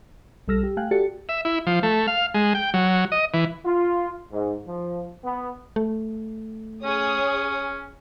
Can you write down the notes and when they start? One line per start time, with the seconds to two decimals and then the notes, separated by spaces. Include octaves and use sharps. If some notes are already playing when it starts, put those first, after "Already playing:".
0.48 B1 G3 A4 E6 F6 A#6
0.63 G4
0.77 A3 F5 G5 G#5 F#6
0.91 F#4 G4 A4 D5 A6 C#7
1.29 E5
1.45 E4
1.67 F3
1.83 A3
2.07 F5
2.34 G#3
2.55 G5
2.74 F#3
3.12 D#5
3.34 E3
3.66 F4
4.32 G#2
4.66 F3
5.24 B3
5.76 A3
6.84 C#4 G#4 C#5 D#6